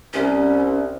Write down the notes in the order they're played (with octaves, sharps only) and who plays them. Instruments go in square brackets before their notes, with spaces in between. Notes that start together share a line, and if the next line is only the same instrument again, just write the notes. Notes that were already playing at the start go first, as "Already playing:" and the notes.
[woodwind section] C2 [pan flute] C#4